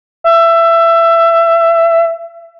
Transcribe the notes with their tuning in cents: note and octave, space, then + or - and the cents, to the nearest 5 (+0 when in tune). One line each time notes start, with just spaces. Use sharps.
E5 +20